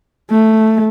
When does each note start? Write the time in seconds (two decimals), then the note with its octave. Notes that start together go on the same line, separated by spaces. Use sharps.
0.31 A3